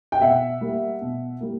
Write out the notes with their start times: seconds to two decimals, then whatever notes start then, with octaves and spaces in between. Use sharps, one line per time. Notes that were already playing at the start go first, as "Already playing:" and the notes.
0.12 G5
0.21 B2 E5 F#5
0.61 G3 A#3
1.01 B2
1.40 G3 A#3